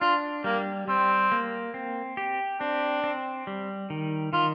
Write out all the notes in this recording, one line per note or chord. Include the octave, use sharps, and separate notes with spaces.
D4 F4
G3 A#3
G3 C4
A#3
C4
G4
C4 D4
C4
G3
D#3
D#3 F4